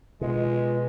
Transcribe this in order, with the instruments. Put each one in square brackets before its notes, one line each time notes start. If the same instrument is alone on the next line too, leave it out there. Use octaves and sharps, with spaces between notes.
[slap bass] B2 [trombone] G#3 [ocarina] F4